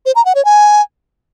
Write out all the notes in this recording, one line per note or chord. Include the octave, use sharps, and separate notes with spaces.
C5
A#5
F#5
C#5
G#5